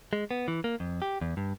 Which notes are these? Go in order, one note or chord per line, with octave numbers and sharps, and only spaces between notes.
G#3
B3
E3
A#3
F2
G4
E2
G2